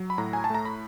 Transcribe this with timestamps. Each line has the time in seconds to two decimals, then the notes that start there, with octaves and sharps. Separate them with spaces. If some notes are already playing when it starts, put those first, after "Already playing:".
Already playing: F#3
0.10 B5
0.18 A2 A#5
0.33 G#5
0.44 A5
0.50 A3 A#5
0.65 B5